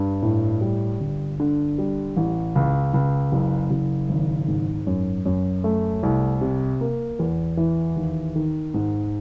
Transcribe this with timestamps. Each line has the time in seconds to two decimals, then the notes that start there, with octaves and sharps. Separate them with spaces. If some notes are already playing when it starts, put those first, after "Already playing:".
Already playing: G2
0.23 A2
0.61 G3
1.00 G1
1.40 D3
1.78 G3
2.17 A1
2.55 C#2
2.94 C#2
3.32 F#1
3.71 F#1
4.09 G#1
4.48 G#2
4.87 F#2
5.26 F#2
5.64 A3
6.03 C2
6.41 C3
6.81 A#3
7.19 E2
7.57 E3
7.97 D#2
8.36 D#3
8.74 G#2